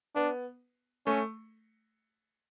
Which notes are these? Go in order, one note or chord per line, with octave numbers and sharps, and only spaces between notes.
B3 D4
A3 C#4